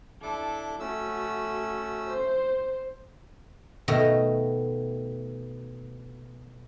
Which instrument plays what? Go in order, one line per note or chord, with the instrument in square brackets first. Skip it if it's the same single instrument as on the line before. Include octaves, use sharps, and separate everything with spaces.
[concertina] D4 E4 D6 [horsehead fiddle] A4
[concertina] A3 C#4 E6 [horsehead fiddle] F#4
[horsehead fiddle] C5
[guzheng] B2 D#3 A3 D#5